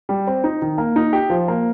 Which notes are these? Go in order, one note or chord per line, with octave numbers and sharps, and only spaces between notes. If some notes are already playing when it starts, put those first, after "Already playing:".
G3
C4
D#4
D#3
A#3
D#4
G4
F3
A#3